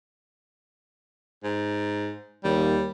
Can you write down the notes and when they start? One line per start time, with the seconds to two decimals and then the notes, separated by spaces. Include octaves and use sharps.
1.44 G#2
2.44 D#2 G3